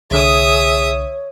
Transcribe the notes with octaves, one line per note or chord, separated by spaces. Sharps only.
C2 D3 G#4 C#5 E5 D#6